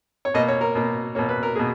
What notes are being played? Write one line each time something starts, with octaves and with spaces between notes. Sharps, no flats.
C#5
B2 A#3 D#5
C#5
A#4
B2 A#3
B2 A#3 C#5
B4
A#4
B2 A#3 G#4